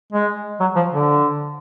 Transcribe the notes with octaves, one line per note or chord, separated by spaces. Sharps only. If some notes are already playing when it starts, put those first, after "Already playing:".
G#3
F#3
F3
D3